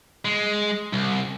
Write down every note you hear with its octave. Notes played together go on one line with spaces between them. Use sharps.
G#3
C2